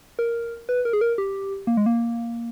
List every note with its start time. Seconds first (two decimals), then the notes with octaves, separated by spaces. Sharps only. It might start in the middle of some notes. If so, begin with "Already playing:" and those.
0.19 A#4
0.69 B4
0.85 A#4
0.93 G#4
1.01 A#4
1.18 G4
1.67 A#3
1.77 G#3
1.86 A#3